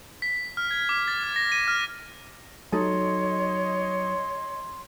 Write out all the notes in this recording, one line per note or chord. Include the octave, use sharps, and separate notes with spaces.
B6
F6
G#6
D6
A6
F6
A#6
D#7
F6
F#3 D#4 A4 C#5 D#5 C6